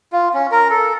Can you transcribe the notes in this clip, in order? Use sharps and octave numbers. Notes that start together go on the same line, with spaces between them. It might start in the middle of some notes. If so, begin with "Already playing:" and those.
F4
C#4
A#4
A4